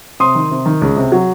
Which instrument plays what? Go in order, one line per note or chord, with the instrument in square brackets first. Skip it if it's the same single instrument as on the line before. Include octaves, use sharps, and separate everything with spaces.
[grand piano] C3 C6 D#6
D#3
C3
D#3
C#2
C3
F#3